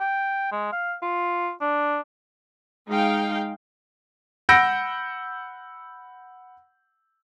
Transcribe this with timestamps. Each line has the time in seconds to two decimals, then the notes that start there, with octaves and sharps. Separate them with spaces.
0.01 G5
0.52 G#3
0.73 F5
1.03 F4
1.61 D4
2.88 G#3 D#4 F5 G5
4.49 F#5 B5 E6 G6 A#6 D7